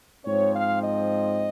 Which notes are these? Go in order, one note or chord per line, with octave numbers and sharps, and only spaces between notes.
G#2 F3 C4 C#5
F5
D#5